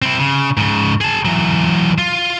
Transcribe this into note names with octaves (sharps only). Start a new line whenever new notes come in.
C4 E4
C#3
G#2 C#3
G#4 A5
E3 F#3
F4